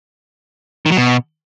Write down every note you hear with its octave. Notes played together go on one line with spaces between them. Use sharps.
D#3
F#3
B2